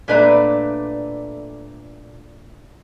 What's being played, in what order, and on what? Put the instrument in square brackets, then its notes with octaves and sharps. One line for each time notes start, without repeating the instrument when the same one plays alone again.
[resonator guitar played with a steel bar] A#2 A3 D4 B4 D5 A#5